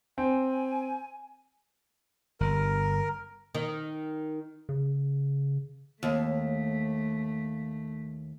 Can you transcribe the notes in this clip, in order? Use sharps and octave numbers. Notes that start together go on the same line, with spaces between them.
C4 G#5
G1 A#4
D#3
C#3
D#2 A3